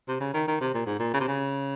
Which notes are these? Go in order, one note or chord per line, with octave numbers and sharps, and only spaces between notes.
C3
C#3
D#3
D#3
C3
A#2
G#2
A#2
C#3
C3
C#3